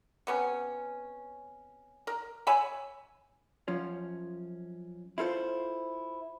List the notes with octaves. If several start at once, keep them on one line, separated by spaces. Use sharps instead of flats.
C3 B3 C#4
A#4
C#5 E5 G#5 B5
F#2 F3 C#4
E4 F4 A4 C5